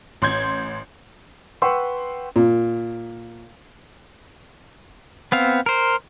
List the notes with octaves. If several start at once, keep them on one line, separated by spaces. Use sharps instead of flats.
A1 C6 G6 G#6
B4 F#5 G5 C6 C#6 E6
A#2
B3 C4 F5
A#4 C5